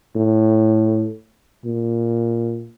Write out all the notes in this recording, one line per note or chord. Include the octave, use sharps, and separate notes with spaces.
A2
A#2